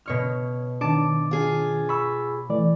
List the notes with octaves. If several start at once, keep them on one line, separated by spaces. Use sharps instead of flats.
B2 C#5 F6
D#3 D4 A5 D6
F4 G#4
B5 C#6 E6
E3 A3 D5